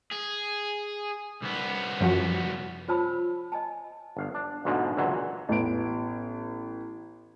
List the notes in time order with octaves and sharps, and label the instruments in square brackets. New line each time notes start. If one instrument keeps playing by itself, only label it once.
[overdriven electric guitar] G#4
C2 B3
[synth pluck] F#2 F3 F#4
[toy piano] F4 C5 C#5 A5 B5 E6
D#5 G#5 A5
[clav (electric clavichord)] G1 F5
D4
D2 G#2 B2 D3 F3 G#3
C#2 A#2 D3 E3 F#3
[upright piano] A1 B3 D7